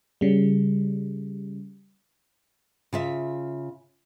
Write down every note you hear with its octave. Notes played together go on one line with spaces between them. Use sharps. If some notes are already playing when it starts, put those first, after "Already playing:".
C#3 G3
C#3 F4 E5